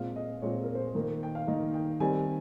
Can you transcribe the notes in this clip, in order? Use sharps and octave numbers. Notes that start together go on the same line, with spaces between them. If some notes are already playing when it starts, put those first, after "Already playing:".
Already playing: A#2 G#3 C4 F4 F5
D#5
A#2 G#3 C4 F4 C#5
C5
A#4
C5
D#3 A#3 D#4
G5
F5
D#3 A#3 D#4 D#5
G5
D#3 G3 C4 G#5